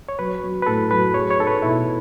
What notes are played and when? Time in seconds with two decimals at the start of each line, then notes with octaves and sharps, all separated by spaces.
0.09 C#5
0.19 F#3 B4
0.43 F#3
0.62 B4
0.67 A2 A4
0.91 F#3 B4
1.14 G#4 C#5
1.30 C#5
1.39 D#4 A4
1.47 B4
1.62 B2 E4